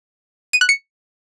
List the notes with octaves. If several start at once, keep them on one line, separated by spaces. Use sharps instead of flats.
D#7
F#6
C#7